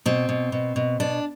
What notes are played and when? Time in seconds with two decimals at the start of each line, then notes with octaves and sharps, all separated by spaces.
0.06 B2 C4
0.29 B2
0.52 B2
0.76 B2
1.00 B2 D4